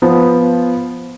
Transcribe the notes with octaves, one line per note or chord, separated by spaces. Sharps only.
F3 B3